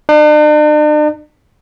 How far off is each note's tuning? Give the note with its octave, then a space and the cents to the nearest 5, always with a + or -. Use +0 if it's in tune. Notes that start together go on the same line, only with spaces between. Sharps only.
D4 +45